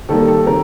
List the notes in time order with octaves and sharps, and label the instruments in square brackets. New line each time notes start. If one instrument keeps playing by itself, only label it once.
[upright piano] D#3 G3 A#3 A4
A4
D#3 A#4